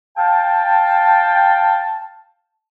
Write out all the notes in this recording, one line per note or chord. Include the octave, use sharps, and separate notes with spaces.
F5 G5 A5